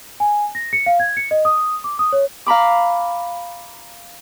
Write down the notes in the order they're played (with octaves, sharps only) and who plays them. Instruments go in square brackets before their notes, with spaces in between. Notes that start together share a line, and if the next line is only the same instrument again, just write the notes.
[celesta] G#5
A#6
C#7
F5
G#6
C#7
D#5
D#6
D6
D#6
C#5
[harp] F5 A#5 B5 D6